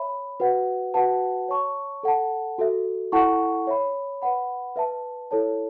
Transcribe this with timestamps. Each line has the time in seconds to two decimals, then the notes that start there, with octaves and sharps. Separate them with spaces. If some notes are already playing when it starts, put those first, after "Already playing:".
Already playing: C#5 E5 B5
0.40 F#4 B4 F#5
0.94 F#4 B4 F#5 A5
1.48 C#5 A5 C#6
2.03 A4 F#5 A5
2.58 F#4 A4 E5
3.12 E4 A4 F#5 A5 C#6
3.67 C#5 E5 B5
4.22 B4 F#5 B5
4.76 B4 E5 A5
5.31 E4 A4 C#5 A5